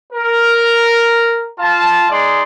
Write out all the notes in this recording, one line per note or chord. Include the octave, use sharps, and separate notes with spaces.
A#4
F4 A5
G#3 D#4 D5 C6